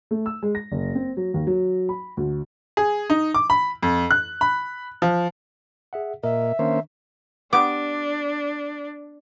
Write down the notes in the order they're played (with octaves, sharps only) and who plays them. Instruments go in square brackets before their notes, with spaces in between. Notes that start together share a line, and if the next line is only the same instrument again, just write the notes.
[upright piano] A3
E6
G#3
A#6
F#1
C4
F#3
D#2
F#3
B5
D2
[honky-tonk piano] G#4
D#4
D6
B5
F2
F#6
B5
F3
[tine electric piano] G#4 E5 F#5
[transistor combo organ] A#2 [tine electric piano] A#4 D#5 [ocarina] E5
[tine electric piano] D#3 D4 [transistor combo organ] A#3 C#4 C5
[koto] B3 G4 [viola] D4 [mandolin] D6